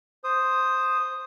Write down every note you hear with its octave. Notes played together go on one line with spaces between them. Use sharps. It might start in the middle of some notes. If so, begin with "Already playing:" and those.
C5 D#6